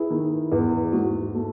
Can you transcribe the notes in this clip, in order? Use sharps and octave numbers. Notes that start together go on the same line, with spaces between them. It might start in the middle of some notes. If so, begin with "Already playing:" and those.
Already playing: E4 G#4 B4
D#3
E2
G#2 F#4
A3